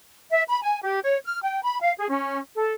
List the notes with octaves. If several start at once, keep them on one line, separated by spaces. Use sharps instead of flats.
E5
B5
G#5
G4
C#5
F6
G5
B5
F5
G#4
C#4
A4